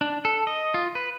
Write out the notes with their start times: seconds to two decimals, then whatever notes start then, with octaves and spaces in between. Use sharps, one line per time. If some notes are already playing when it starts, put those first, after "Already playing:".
0.01 D4
0.25 A4
0.47 D#5
0.74 F4
0.95 B4